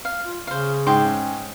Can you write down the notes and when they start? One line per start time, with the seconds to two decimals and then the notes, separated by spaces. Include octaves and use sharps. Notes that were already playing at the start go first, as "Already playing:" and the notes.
0.05 F5
0.24 F4
0.47 C#3 C5 F5
0.87 G#2 G5 C6 D6
1.05 C#4